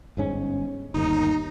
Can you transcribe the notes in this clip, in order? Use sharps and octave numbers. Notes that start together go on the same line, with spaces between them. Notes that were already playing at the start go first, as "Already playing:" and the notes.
G1 G#2 C#4
G1 D#2 D#4